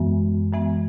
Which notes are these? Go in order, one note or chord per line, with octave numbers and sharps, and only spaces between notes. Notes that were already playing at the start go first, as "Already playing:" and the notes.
Already playing: F#2 E3 G#3 B3
F#2 E3 G#3 B3